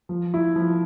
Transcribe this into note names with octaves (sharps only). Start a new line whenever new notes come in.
F3
E4
F3